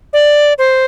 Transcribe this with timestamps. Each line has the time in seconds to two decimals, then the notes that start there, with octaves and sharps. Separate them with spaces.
0.13 D5
0.58 C5